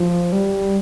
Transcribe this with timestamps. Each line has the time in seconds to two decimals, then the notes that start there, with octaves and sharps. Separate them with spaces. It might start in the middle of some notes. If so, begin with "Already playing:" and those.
Already playing: F3
0.32 G3